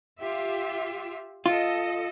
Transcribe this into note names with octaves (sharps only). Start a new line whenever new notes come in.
F4 G4 E5
F4 A4 D#5